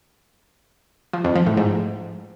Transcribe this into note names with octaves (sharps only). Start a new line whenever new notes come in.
F3
F2
F3
A2
G#2